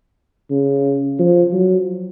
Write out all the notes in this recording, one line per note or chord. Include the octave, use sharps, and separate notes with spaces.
C#3
F3
F#3